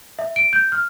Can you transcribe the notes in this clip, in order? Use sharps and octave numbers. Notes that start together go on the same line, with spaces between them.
E5
D7
G6
F6